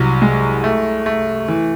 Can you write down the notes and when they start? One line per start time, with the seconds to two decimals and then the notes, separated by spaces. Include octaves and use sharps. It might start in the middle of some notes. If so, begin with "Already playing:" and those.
Already playing: C2 F#3
0.22 G#3
0.64 A3
1.06 A3
1.48 E3